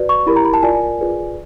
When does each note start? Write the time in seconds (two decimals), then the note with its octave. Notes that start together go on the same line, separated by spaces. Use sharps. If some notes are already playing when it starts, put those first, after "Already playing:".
Already playing: F#4 B4 D5
0.09 C#6
0.26 E4 G4 A#4 B5
0.36 A#5
0.45 B5
0.54 A5
0.63 F4 A#4 D5 G#5
0.99 F4 G#4 B4 D5